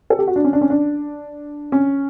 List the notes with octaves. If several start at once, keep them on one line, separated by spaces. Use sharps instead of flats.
A4
G4
F#4
D4
C#4
D4
C#4
D4
C#4